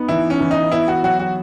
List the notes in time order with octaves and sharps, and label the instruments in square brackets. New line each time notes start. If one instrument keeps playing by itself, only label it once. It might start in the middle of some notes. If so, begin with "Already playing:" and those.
Already playing: [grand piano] B3 D#4
[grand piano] E3 [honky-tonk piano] E4
[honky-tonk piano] C#4
[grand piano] E3
[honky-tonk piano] D#4
[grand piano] B3 [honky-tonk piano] E4
[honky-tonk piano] F#4
[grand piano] F#3 [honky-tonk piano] F#4
[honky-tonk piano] F#4